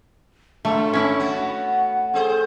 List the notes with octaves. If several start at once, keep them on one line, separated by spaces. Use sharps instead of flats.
A2 F#3 A3 D4
G#2 C#4 E4
B3 F#4
F#5
C4 G#4 A4 C5